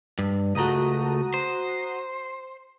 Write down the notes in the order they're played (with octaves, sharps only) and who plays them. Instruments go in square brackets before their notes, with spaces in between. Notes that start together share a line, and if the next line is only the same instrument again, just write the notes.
[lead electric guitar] G2
[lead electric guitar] C#2 A3 [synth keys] F#4 A#5 D#6
[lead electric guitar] C5